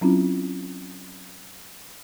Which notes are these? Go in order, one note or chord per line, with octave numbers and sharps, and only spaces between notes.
F#3 C4 C#4 E4 F4